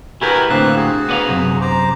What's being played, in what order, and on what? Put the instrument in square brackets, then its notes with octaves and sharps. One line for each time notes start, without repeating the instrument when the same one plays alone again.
[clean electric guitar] E4 G4 B4 [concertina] F#4 A#4 G#5
[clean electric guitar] A2 D3 C5 [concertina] A#3 C4 F#6
[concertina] F#4 G#4
[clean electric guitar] B3 D5 F5
F#2 C3
[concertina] C5 A#5 D6